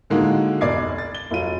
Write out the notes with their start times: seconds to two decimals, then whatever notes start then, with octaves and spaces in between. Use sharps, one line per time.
0.10 A2 D3 D#3 G#3 A#3 F#4
0.61 F1 B1 D5 D6 G#6 C7
0.98 A6
1.15 G7
1.31 F1 F#3 F4 D#7